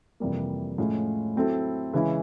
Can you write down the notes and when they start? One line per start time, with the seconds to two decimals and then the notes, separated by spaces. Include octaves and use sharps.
0.20 F2 C3 E3 G3 A#3
0.78 A2 F3 G#3 C#4 F4
1.36 F#3 A3 C4 E4 A4
1.94 C#3 E3 G#3 C#4 E4